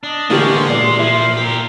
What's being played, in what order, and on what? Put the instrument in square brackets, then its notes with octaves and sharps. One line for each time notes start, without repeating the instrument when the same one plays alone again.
[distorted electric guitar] D4 [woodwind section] D#5 A5
[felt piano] A2 E3 G4 [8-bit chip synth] D3 A#3 [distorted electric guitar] G#3 [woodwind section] C#4 F4
[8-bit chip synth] A#2 [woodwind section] E3 C6 [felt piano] D5
[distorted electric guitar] F3 [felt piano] E4
[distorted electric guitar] G4 A#4